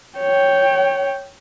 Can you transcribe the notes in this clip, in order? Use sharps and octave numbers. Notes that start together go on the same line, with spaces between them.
C#5 G5